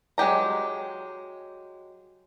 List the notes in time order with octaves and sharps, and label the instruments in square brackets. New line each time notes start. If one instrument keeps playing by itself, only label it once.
[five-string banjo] F#3 G#3 G4 A#5